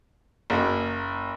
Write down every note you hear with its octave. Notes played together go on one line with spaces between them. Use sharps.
F#1 A#3